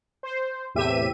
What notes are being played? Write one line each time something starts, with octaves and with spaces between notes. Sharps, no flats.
C5
E2 A2 C3 G4 E5 D#7